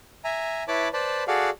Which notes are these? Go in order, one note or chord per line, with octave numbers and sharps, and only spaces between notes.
E5 G#5 A#5
E4 B4 C#5 A5 B5 D6
B4 C5 D5 A5 B5
F#4 G#4 A4 D5 F5 F#5